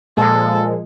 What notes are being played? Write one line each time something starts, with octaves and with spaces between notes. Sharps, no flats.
A#2 F3 G#3 A4